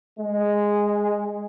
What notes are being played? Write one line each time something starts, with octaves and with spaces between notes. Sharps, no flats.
G#3